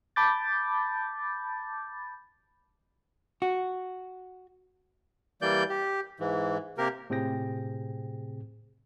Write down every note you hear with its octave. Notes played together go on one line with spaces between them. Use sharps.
A5 B5 D6 G6 A6
F#4
E3 G3 A#3 D5 G6
G4
G#2 E3
C3 A#3 G4 A#4
A2 C3 C4 G#4 G5 A#6